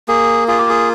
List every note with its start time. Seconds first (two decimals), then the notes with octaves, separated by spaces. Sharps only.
0.08 A#3 G#4
0.48 F4 G#4
0.58 G4
0.69 G#4